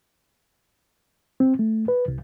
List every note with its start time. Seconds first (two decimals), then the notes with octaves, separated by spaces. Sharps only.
1.40 C4
1.59 A3
1.88 B4
2.08 C2